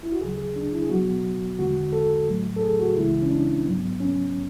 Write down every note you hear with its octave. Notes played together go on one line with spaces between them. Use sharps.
E4
F#4
D2 C#3 F#3 G#4
G#4
D4
E4
G#4
B2 F#3 B3 F#4
E2 D3 G#3 F#4
A4
A2 F#3 A3
A4
G#4
F#4
C#2 C#3 E3 G#3 E4
C#4
D4
G#2 F#3 B3
C#4